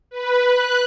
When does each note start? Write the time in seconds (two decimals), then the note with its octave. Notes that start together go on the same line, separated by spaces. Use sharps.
0.11 B4
0.41 F#6